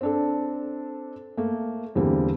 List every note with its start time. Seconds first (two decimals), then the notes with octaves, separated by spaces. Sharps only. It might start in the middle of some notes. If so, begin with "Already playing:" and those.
0.01 C4 D4 A4
1.37 A3 A#3
1.96 E2 D3 G3 A#3 C4